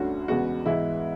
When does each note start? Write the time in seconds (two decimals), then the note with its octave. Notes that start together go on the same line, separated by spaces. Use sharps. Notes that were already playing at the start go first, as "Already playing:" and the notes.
Already playing: D2 D3 A3 C#4 F#4
0.28 E2 C#3 G#3 B3 F#4
0.66 G#2 E3 G#3 B3 E4